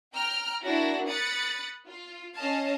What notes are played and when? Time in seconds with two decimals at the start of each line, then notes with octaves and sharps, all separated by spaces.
0.14 G5 A#5 F6
0.63 A#3 D4 E4 F#4 E5 A#6
1.07 B5 D#6 F#6 A6 C#7
1.86 F4
2.35 C#4 D#5 F5 A5